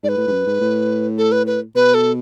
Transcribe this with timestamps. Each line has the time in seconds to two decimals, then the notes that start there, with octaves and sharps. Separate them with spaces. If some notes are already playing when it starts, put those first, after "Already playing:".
0.03 G#2 D5
0.09 B4
0.17 A2
0.28 G#2
0.32 F#2
0.47 G#2
0.61 A2
1.18 A4
1.32 B4
1.47 B4
1.75 B2 B4
1.94 A4